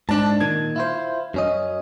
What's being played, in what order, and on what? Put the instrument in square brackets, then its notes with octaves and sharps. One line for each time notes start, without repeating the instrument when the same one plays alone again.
[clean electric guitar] G#2 [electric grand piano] D4 A5
[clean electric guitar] A#2 D#3 [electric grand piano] G#6
[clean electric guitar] E4 F4 C5
F#2 C#4 D#5